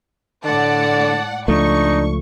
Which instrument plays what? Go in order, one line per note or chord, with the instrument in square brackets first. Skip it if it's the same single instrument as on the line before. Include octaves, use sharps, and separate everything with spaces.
[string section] A2 D5 F#5 [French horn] D3 [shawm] A5
[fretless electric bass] C#2 F3 A3 [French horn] D4 [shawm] D#4 [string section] C#6